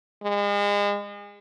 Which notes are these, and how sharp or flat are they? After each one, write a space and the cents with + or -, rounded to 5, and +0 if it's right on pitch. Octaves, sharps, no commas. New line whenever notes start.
G#3 -35